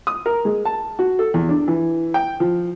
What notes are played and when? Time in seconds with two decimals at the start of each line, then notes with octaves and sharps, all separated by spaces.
0.07 D#6
0.26 A#4
0.45 G#3
0.65 A5
0.99 F#4
1.19 A4
1.34 E2
1.49 D4
1.68 E3
2.14 G5
2.40 F3